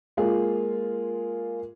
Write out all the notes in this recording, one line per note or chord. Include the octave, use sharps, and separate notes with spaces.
G#3 A#3 F4 G#4